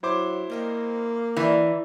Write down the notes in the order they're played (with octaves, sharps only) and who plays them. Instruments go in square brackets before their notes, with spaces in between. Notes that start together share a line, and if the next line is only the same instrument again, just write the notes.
[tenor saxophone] F#3 [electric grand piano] E4 C5 D6
[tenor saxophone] A#3 [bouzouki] C4 D#4 A#4
[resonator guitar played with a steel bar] E3 [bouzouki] G3 A#5